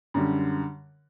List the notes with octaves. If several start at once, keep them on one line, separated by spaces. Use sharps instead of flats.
F#2 D3 G3